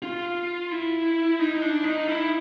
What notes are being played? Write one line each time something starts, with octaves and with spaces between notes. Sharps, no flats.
F4
E4
D#4
D4
D#4
E4